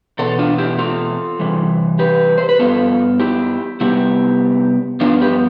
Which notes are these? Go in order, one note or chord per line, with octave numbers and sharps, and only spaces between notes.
E2 B2 A4
D4 F4
E4 G4
F4 A4
C3 E3 G3
G4 B4
C5
B4
G2 F3 B3 F4 A4
E4 G4
C3 G3 B3 E4 G4
G2 F3 B3 D4 F4
G4 B4